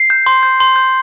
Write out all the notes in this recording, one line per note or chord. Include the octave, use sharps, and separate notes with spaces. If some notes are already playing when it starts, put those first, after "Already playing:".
Already playing: C7
G6
C6
G6
C6
G6